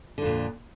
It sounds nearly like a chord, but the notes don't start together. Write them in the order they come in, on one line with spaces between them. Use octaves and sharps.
D3 F2 A#2